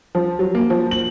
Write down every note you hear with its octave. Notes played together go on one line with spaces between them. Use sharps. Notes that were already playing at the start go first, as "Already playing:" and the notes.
F3
F#3
A#3
F3
F#7